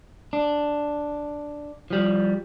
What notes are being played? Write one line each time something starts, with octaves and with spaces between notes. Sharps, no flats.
D4
F3 G3